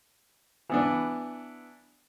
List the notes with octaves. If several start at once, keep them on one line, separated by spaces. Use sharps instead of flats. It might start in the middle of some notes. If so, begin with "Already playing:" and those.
E3 B3 D4